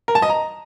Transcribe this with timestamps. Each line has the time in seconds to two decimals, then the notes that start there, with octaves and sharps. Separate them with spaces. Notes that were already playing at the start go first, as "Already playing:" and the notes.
0.08 A#4
0.15 A5
0.22 D#5
0.30 A#5